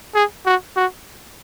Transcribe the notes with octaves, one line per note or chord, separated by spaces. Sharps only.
G#4
F#4
F#4